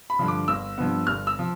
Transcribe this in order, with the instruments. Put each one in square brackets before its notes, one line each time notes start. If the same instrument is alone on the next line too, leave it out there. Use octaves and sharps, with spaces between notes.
[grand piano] B5
G2 D3 F3
D6
G1 E6
G2 F3 B3
G1 F6
E6
F3